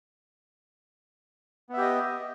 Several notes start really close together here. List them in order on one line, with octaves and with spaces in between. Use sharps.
B3 E5 G4 D#5